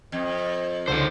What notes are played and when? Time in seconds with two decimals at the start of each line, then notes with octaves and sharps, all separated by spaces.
0.12 F2 D#5
0.88 C#2 D3 D#3 C5